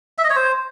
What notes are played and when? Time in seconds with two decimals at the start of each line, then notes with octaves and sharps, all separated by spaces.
0.18 E5
0.24 D#5
0.30 C#5
0.36 C5